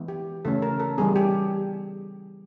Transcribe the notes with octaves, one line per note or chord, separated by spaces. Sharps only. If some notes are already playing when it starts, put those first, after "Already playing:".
Already playing: E3 G#3 B3
G4
C#3 E3 A3 C#4 A4
A#4
A4
E3 G3 B3 G#4
G4